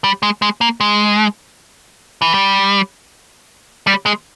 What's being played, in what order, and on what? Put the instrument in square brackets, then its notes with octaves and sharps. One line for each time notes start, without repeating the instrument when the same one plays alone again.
[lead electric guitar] G3
G#3
G#3
A#3
G#3
E3
G3
G3
G#3